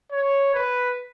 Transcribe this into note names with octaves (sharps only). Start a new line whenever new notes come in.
C#5
B4